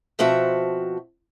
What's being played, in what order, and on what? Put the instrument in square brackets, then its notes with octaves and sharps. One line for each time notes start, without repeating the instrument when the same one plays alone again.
[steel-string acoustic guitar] B2 F3 C4 F#4 E5 A5